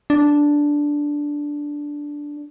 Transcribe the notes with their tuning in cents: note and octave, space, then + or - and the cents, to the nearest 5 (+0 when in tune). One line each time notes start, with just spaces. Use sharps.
D4 -5